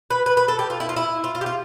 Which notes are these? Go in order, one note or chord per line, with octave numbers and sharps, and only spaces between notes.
B4
B4
B4
A4
G4
F4
E4
F4
E4
F4
F4
G4
F4